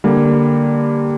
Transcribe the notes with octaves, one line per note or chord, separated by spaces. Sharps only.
D3 G3 A#3